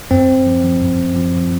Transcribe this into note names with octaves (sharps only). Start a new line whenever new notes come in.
F#2 C4
F#2
F3
F3
F#2
F#2
F3
F3